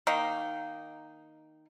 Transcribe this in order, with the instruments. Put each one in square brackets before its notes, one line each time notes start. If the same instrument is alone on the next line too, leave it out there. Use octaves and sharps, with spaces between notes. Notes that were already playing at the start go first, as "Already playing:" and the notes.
[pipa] D#3 A#3 D#4